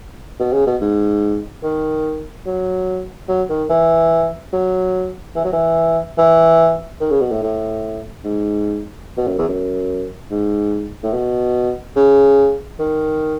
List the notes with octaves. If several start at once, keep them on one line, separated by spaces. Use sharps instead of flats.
B2
C#3
B2
G#2
D#3
F#3
F#3
D#3
E3
F#3
E3
F#3
E3
E3
D#3
C#3
B2
A2
A2
G#2
B2
F#2
E2
F#2
G#2
A2
B2
C#3
D#3